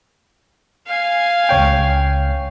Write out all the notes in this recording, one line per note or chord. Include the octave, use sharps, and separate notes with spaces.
F5 G#5
C#2 C#5 G5